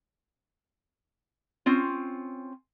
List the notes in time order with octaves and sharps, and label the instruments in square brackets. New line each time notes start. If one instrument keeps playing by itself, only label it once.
[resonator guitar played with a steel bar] C4 C#4 F4